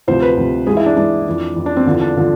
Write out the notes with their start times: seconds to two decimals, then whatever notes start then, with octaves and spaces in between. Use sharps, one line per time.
0.08 D2 C3 F3 C5
0.22 B4
0.37 D2 C3 F3
0.67 G#2 E3 G#4
0.77 E4
0.86 D4
0.97 G#2 E3 D4
1.26 F2 E3
1.56 F2 E3
1.66 D4
1.76 C4
1.86 E2 D3 F3
2.01 D4
2.17 D3 F3